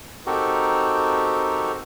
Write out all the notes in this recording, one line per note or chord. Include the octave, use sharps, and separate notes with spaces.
C4 D#4 F#4 G4 A4 A#4